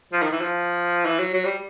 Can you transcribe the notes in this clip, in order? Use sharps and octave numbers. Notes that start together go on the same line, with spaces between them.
F3
D#3
E3
F3
E3
F#3
F#3
G3